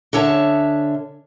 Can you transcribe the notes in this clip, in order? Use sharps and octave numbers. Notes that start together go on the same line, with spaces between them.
D3 C#4 C#5 E5 A5